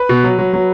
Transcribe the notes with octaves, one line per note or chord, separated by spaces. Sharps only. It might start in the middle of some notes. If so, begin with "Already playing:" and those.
Already playing: B4
B2
F#3
F#3
F#3